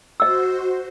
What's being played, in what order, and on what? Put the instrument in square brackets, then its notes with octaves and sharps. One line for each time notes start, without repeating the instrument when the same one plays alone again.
[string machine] F#4 C5 [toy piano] D#5 E6